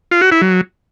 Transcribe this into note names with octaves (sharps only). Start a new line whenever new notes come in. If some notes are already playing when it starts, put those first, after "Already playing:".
F4
F#4
E4
F#3